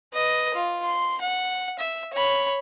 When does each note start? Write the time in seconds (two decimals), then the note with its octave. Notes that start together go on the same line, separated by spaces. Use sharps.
0.14 B4 D#5
0.54 F4
0.84 C6
1.22 F#5
1.79 E5
2.13 C#5 B5